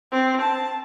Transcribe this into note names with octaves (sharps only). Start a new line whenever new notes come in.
C4
A5